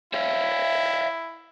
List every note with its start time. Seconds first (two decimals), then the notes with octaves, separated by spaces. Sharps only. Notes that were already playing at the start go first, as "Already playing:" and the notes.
0.14 E4 C#5 E5 F5